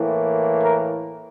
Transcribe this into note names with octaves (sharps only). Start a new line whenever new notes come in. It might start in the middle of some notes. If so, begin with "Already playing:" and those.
Already playing: A2 E3 A#3
A#4